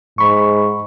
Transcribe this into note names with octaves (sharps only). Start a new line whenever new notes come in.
G#2 B5 C#6